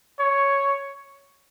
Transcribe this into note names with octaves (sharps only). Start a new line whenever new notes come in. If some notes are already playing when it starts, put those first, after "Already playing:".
C#5